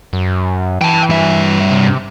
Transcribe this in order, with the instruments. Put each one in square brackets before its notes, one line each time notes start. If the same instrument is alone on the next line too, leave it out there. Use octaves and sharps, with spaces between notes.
[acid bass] F#2
[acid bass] E3 [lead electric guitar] G5 A5
[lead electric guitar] G2 E5
[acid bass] C3